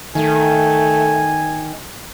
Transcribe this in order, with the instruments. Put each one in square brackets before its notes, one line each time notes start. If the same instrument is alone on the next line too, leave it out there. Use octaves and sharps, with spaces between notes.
[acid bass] D#3 [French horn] A3 [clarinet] G#5